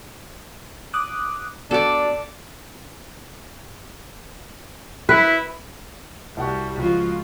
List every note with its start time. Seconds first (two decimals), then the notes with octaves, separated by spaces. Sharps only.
0.94 D6 D#6 F#6
1.71 B3 D4 F#4 A4 D5
5.09 E4 B4
6.37 C2 G3 F#4 F#5 C#6
6.77 C#2 F3 G#3 F4 F#4